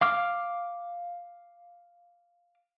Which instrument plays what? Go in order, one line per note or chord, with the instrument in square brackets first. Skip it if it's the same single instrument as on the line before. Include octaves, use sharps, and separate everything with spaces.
[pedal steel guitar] F5 D6 F6